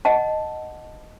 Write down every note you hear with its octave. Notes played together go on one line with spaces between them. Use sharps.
D#5 F#5 A5